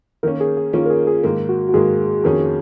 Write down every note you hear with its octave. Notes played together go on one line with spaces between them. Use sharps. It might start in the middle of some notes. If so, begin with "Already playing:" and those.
D#3 A#3 C#4 A#4
G#4
G#4
D#3 A#3 C#4 F4
A#4
G#4
G#4
G#2 D#3 A#3 G#4
F#4
F#4
G#2 D#3 A#3 G#4
F2 D#3 A#3 C#4 G#4